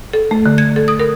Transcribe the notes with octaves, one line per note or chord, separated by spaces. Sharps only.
A4
A3
D3
G#6
A4
D#6
A#4